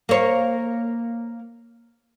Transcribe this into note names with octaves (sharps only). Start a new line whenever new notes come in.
A#3 C#5